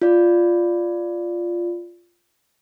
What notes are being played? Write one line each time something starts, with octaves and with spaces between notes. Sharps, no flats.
F4 D5